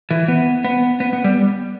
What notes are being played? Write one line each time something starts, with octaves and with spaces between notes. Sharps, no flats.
E3
B3
B3
B3
B3
G3